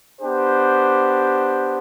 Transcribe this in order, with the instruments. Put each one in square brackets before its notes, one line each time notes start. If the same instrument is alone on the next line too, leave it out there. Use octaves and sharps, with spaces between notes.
[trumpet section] B3 D4 G4 C5